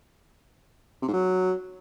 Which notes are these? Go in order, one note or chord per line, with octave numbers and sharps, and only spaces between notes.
C3
G#2
F#3